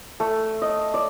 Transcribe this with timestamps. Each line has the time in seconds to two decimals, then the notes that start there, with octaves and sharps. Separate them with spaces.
0.20 A3
0.62 D#5
0.94 D5